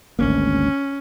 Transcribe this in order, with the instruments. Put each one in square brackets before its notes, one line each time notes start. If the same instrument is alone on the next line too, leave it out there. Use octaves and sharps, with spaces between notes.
[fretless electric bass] G#1 D2 A#3 [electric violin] C#4